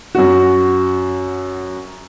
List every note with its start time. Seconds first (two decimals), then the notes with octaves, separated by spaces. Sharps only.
0.15 F#2 F#4